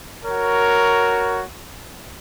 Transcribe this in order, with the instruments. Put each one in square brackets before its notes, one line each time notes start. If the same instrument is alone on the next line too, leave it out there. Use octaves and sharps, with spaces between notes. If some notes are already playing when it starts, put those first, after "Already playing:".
[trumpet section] F#4 A#4 C#5